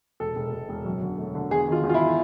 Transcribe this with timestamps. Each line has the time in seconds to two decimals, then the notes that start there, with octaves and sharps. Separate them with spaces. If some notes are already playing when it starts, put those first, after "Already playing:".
0.20 E1 A4
0.36 E1
0.53 E1
0.69 E1
0.85 F#2
1.02 D3
1.18 A3
1.35 D3
1.51 E2 G#4
1.68 D#3 F4
1.83 E2
1.89 F4
1.94 E4